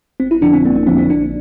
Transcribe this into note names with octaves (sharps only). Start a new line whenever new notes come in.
G1 C4
E4
F2 D3 F3 D4
C4
G1 A#3
A#3
F2 D3 F3 C4
C4
A#1 D4